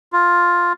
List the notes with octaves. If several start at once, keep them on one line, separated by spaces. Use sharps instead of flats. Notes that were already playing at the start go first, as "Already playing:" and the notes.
F4